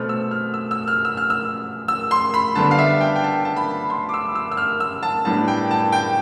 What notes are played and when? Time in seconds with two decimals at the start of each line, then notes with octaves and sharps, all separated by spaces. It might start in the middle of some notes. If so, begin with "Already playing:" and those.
Already playing: B2 A3 C4 F6
0.09 E6
0.31 F6
0.54 E6
0.71 E6
0.88 F6
1.05 E6
1.17 F6
1.30 E6
1.88 E6
2.11 C6
2.34 B5
2.55 D3 G3 B3 D4 A5
2.71 F5
2.79 E5
3.01 G5
3.16 G5
3.24 A5
3.45 A5
3.56 B5
3.90 C6
4.09 D6
4.14 E6
4.35 E6
4.52 E6
4.57 F6
4.80 E6
5.03 A5
5.25 A2 G3 B3 D4 A5
5.48 G5
5.71 A5
5.92 G5